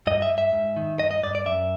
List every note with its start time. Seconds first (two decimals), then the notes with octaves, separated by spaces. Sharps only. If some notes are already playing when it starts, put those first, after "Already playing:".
0.07 G2 D#5
0.22 E5
0.30 G2
0.38 E5
0.53 G#2
0.77 D#3
0.99 G2 D#5
1.11 D#5
1.23 G2 D5
1.35 D5
1.46 F#2 E5